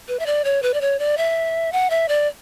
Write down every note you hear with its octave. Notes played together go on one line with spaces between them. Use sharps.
B4
E5
D5
C#5
B4
D5
C#5
D5
E5
F#5
E5
D5